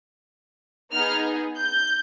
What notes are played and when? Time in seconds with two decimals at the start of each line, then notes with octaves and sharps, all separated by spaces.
0.92 B3 D#4 G#4 F6
1.58 G6